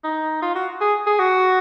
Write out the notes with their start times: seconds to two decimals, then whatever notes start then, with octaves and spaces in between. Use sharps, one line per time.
0.04 D#4
0.42 F4
0.55 F#4
0.81 G#4
1.07 G#4
1.19 F#4